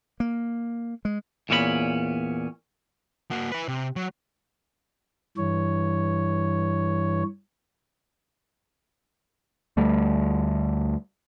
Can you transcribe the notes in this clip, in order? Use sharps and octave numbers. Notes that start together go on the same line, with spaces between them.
A#3
G#3
E2 A#2 C#4 F#4 B5
A#3 F#4
E4 B4
C3
F#3
G2 E3 C#5
D2 G3 A3